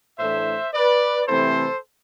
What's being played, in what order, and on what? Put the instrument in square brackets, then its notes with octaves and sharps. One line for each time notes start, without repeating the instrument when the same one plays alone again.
[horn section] A2 E3 A3 D4 C5 E5
B4 D5
C3 E3 A3 C4 E4 A4 C5